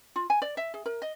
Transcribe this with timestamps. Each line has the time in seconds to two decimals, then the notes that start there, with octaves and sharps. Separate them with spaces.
0.16 F4
0.30 G#5
0.42 D5
0.57 E5
0.74 G#4
0.86 A#4
1.02 D#5